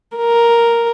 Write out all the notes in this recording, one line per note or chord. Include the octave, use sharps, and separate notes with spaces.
A#4